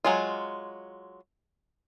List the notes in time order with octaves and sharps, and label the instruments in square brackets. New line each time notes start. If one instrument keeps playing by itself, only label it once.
[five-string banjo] F#3 G#3 F4